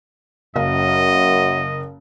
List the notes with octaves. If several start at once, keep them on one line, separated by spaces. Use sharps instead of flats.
F#1 F#2 D#5 F5